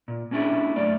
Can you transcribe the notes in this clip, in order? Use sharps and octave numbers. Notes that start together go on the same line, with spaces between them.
A#2
A#3 C#4 D4 E4 G4 G#4
F#2 A3 A#3 D5